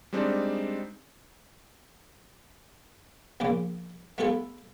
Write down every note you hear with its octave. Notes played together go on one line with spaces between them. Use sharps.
G3 G#3 C4 D4 D#4
A#1 A#2 C#3 D6
A3 B3 E4 F4 G#4 A4